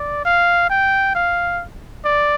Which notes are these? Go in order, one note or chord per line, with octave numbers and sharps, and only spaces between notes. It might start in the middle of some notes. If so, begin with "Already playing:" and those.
Already playing: D5
F5
G5
F5
D5